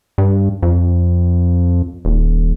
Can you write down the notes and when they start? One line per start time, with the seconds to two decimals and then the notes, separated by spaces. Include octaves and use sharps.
0.18 G2
0.63 F2
2.05 D#1